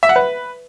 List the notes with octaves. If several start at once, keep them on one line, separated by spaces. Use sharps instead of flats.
E5
F#5
B4